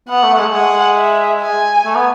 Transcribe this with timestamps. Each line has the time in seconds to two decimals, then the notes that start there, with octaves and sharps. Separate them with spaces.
0.09 B3 F#5
0.23 A3
0.34 A3
0.38 G#3
0.46 A3
0.53 G#3 F#5
0.97 E5
1.41 G#5
1.85 A3
1.96 B3